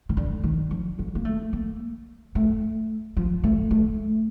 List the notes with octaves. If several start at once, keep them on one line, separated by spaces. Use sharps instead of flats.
D#3
D3
D#3
F3
F3
A#3
A3
A#3
A3
F3
A3
A3